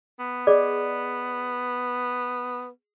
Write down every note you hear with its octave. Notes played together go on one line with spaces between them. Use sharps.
B3
G#4 D5 D#5